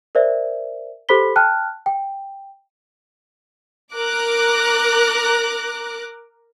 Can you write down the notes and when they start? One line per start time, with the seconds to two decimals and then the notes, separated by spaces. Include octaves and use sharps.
0.15 A#4 C5 D5 E5
1.09 G4 A4 C5 B5 B6 G7
1.36 G5 A5 F6 F#6
1.86 G5
3.96 A#4 A#5 D6 F#6